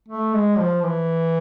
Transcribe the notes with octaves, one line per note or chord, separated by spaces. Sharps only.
A3
G#3
F3
E3